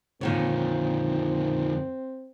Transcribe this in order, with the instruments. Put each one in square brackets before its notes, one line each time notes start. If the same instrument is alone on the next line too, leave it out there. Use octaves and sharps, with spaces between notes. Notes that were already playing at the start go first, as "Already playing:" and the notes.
[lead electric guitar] F2 D3 [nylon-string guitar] A#2 D#3 C#5 [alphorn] C4